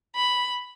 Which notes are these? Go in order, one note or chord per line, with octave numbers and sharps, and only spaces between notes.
B5